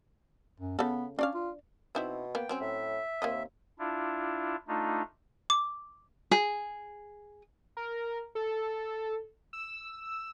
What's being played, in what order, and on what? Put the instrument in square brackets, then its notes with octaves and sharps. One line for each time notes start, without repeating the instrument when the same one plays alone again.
[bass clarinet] F#2
[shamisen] C#3 A4 [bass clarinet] B3
[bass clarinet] C#4 [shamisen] D4 D5 F5
[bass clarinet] F4
[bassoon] B2 [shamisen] C4 D#4 E4
[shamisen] A#3 B3 [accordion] G5
[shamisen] F#3 C4 C#4
[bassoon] A2 [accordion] E5
[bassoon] D#2 [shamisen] A#3 C4 D#5
[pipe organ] D4 E4 F4
A3 D4 D#4 F4
[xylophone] D6
[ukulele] G#4
[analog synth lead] A#4
A4
E6